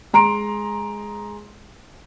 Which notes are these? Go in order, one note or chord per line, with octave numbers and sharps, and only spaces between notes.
G#3 A#5 C6 D7